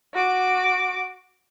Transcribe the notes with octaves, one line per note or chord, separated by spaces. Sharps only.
F#4 D6